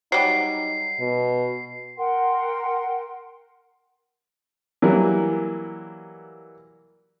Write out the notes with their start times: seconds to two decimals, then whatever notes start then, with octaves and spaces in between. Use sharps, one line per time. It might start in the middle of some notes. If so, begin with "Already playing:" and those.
0.12 F#3 G3 D#4 C7
1.00 B2
1.97 A#4 F#5 G5 C6
4.82 E3 F#3 G3 A#3 E4